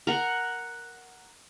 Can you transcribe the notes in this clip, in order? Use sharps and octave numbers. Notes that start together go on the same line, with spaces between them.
A#4 F#5